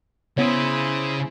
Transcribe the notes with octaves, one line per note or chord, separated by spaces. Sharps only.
C#3 B3 E4 G#4 C5 C#5